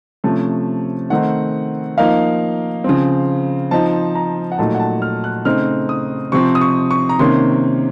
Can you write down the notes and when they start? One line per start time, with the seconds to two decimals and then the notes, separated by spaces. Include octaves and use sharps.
0.24 C3 F3 A3 C#4 A5
1.10 D#3 A3 C4 D#4 F#5
1.98 F3 A#3 D#4 F5
2.84 C#3 F3 C4
3.71 F3 C4 D#4 A5
4.15 A#5
4.52 F#5
4.59 A#2 F#3 A3 D#4 A5
4.75 F#5
4.80 A5
5.02 F6
5.24 F#6
5.45 C#3 A3 C4 D#4 F6
5.89 D#6
6.32 C3 F3 C4 C#6
6.55 D#6
6.61 C#6
6.91 C#6
7.09 A#5
7.19 C3 D#3 A#3 C#4 C6